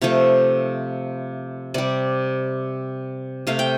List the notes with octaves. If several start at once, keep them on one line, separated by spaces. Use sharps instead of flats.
C3 F3 A3 F5
C3 G3 D5
C3 A3 F5
G5